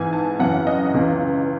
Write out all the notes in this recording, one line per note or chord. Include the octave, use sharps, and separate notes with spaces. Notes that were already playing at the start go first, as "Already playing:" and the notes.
Already playing: G#2 E3 G#5
A5
F#2 C#3 E3 F#5
D#5
C#2 C#3 E3